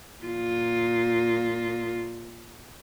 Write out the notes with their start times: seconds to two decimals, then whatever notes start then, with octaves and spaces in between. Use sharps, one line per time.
0.23 A#2 F4